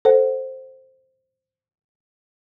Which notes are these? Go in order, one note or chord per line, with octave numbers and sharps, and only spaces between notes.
A4 C5 F#5